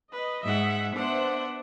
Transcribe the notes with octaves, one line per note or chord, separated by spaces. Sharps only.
B4 D#5
G#2 E5 F#5
B3 D4 C5 E5 F#5